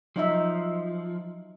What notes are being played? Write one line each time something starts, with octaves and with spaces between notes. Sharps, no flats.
F3 F#3 D#4 E5